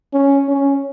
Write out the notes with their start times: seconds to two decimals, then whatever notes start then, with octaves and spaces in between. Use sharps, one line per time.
0.13 C#4
0.49 C#4